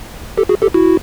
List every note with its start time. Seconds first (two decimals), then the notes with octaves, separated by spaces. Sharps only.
0.38 G4 A4
0.49 F#4 G#4
0.62 G4 A4
0.74 E4 F#4